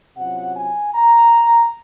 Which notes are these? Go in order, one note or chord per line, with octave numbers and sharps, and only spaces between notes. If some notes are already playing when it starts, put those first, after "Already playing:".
C3 F#3 C#4 F4 F#5
G#5
A#5